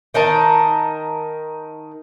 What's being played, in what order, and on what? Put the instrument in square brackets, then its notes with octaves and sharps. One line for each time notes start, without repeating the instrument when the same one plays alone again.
[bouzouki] D#3 D#4 A#4 A5